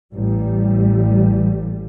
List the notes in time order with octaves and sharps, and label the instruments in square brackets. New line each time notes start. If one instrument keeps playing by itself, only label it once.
[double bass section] A1 G3